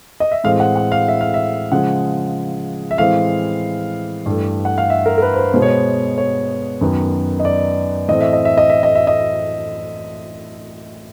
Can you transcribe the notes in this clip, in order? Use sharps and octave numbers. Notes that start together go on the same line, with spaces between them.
D#5
E5
A2 E3 G#3 C4 F5
F#5
F#5
F5
E5
F5
E5
C#3 F3 G#3 F#5
E5
A2 E3 G#3 C4 F5
G2 E3 A3
F#5
F5
E5
A#4
A#4
B4
C5
B4
B2 G#3 B3 C5
C#5
C5
C#5
F#2 D#3 F#3 B3
D#5
D5
A2 E3 A3 C4 D#5
E5
D#5
E5
D#5
E5
D#5
E5
D#5